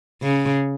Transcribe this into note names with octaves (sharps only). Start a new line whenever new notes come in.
C#3